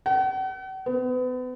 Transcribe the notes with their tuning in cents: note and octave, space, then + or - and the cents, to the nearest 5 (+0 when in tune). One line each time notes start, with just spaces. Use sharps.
F#5 +45
B3 +35